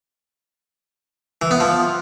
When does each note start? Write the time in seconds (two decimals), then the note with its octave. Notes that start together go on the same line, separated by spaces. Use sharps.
1.42 E3
1.51 B3
1.60 F3